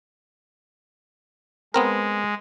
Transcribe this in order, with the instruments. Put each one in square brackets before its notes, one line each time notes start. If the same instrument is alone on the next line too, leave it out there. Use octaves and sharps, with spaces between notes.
[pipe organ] G#3 [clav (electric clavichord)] B3 C4 A#4